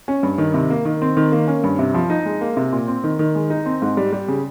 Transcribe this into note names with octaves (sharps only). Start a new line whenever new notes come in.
C#4
G2
D#3
C3
A#3
D#3
C4
D#3
A#3
C#4
G2
C3
F3
D#4
G#3
A#3
C3
A#2
C4
D#3
D#3
G#3
D#4
C4
G#2
G3
G3
C#3